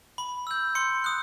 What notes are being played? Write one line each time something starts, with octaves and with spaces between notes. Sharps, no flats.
B5
E6 G6
C6 C#7
D#6 F#6